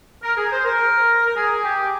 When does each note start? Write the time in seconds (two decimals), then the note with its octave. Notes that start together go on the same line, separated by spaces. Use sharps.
0.23 A#4
0.37 G#4
0.52 C5
0.65 A#4
1.26 A#4
1.36 G#4
1.64 G4